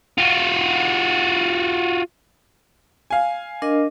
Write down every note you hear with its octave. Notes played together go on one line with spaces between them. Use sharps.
F4 F#4
F5 G#5
D4 A#4 D#5